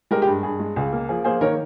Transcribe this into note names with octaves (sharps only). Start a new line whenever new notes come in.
G#3 G4 A#4
G4
G2
G2 G#4
G#3
C#2 G#4
A#3
F3 G#4
A#3 G#4 C5
D#3 A#4 C#5